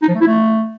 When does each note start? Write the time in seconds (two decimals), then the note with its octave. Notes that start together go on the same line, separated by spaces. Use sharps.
0.02 D#4
0.08 F3
0.15 A3
0.21 E4
0.27 A3